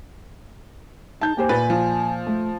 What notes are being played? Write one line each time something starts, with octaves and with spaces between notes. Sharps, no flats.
D#4 A5 G6
A#3 G4 C5 G#5
A#2 B4 A6
F3
A3